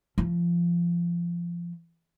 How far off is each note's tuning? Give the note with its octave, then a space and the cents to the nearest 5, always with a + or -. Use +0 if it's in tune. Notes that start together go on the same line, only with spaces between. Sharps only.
F3 -20